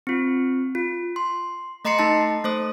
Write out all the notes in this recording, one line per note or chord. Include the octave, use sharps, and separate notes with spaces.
C4 F4
F4
C6
A3 D#5 A#5 C6 C7 C#7
A3 D#4 A5
A3 C5 D#6